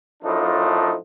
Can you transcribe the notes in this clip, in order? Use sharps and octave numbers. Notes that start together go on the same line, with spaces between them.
F#2 A2 F3 D4 D#4 F4